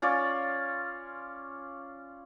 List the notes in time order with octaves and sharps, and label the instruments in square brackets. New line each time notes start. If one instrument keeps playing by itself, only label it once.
[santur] C#4 F4 C#5 D5